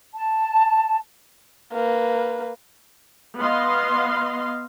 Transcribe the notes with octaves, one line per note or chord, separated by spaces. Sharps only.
A5
A#3 B4
B3 D#5 F5 C6